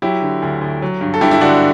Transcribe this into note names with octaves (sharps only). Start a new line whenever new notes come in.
F#3 E4 G4
D3
D2
D2
F#3
G2
A4
G2 E4 G4
E4
D3 D4 F#4